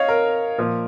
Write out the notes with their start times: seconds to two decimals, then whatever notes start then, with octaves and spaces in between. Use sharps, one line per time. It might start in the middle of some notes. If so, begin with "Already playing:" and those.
Already playing: C#5 D#5 F5
0.08 A#4
0.58 A#2 F3